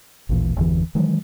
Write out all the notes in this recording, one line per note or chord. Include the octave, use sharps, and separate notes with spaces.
A1 D#2 A#2 E3
G1 E2 D3 E3
D#3 E3 F#3 G#3